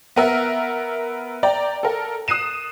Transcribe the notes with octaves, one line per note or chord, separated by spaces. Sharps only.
B3 A#4 E5
D5 G5 A#5
A4 A#4
D#6 F#6 C7 D#7 E7